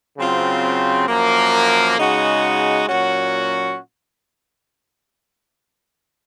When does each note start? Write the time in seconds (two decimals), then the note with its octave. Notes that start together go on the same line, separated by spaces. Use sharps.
0.17 C#3 F#3 C4 F4
1.08 F#2 F3 A#3
1.97 C#3 G#3 D#4 F#4
2.88 A#2 F#3 C#4 F#4